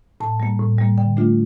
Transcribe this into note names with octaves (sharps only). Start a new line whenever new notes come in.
A2 A5
G3 A#3
A2
G3 A#3
D3 G5
A3 D4 F4